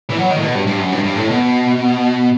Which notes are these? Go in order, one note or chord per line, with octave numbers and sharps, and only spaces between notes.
E3
F#3
D#3
A2
B2
G2
G2
F#2
G2
G2
A2
B2